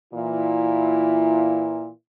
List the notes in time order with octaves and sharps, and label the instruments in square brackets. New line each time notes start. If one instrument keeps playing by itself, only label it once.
[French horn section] A#2 E3 E4